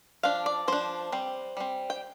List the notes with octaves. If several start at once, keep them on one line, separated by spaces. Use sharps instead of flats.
F3 D4 F5
D5
F3 D4 C5
G3 C4
G3 C4
G5